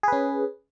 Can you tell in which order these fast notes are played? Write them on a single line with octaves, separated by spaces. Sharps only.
G#4 B4 C#4